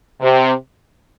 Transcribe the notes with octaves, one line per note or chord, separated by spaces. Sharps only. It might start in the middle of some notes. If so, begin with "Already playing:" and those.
C3